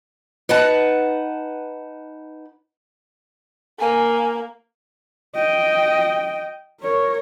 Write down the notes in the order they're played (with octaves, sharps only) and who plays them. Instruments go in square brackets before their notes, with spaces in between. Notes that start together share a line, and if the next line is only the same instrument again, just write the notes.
[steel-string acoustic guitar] D#4 B4 F#5 A5
[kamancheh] A#3 [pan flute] G#5
[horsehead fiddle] D#5 G5
A#4 C#5